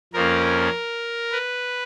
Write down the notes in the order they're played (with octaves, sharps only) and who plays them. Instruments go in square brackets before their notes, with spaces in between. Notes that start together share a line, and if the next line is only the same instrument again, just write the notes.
[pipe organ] F2 F3 A#3 C#4 A#4
B4